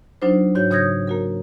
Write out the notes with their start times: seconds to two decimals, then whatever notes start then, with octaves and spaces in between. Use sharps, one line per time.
0.22 F#3 D4 D#4 F4 C5
0.55 G#2 F#4 C#5 G6
0.71 C#3 C#5 D#6 G6 G#6 A#6
1.07 A#3 F#4 A#4